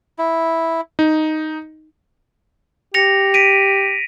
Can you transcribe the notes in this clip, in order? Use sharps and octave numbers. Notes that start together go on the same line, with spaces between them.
E4
D#4
G4 A#6 C#7 F7
B6 D7 D#7